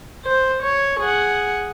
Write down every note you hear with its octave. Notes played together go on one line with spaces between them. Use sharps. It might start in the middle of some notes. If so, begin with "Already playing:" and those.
C5
C#5
G#4 F#5